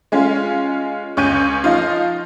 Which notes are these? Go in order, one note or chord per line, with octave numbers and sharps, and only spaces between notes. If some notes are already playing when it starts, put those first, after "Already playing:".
G#3 C#4 F4
C#2 C#4 C#6 G6 D#7
F3 D#4 F4